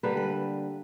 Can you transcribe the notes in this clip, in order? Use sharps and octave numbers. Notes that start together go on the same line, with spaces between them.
D3 G3 A#3 B4
B4